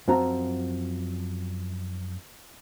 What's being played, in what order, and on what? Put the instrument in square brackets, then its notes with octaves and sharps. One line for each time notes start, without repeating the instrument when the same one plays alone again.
[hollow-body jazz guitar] F#2 F3 C4 F#4 A5 A#5